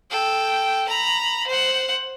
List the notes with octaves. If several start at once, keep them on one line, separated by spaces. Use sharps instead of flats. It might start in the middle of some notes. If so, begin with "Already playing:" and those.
A4 G5
A#5 B5
C5 F#5